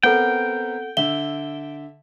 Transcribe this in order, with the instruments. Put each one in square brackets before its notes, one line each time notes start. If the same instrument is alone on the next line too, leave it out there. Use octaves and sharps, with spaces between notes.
[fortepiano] B3 C4 A#4 [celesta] A4 F#5 [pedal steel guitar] G5
[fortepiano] D3 E5 [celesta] G7